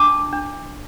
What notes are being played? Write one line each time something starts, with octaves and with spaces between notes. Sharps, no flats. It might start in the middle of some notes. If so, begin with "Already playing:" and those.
Already playing: D4 A5 D6
D4